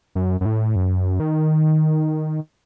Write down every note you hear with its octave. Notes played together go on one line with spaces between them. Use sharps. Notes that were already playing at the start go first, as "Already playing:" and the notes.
F#2
F#2
A2
F#2
D#3